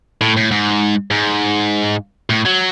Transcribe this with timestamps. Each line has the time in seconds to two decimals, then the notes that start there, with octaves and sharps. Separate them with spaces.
0.21 A2
0.37 A2
0.51 G#2
1.11 G#2
2.30 A2
2.45 F#3